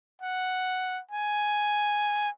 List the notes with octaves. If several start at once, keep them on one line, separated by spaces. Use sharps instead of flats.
F#5
G#5